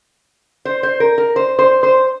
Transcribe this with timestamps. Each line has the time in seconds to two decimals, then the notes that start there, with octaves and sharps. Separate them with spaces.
0.65 C5
0.83 C5
1.00 A#4
1.18 A#4
1.36 C5
1.59 C5
1.83 C5